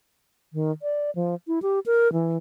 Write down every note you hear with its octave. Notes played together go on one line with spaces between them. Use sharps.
D#3
D5
F3
E4
G4
A#4
E3